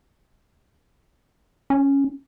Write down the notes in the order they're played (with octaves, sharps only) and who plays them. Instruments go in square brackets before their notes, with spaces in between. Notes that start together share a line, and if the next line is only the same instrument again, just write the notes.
[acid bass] C#4